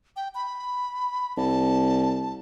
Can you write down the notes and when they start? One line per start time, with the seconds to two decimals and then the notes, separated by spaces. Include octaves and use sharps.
0.16 G5
0.35 B5
1.37 C2 A5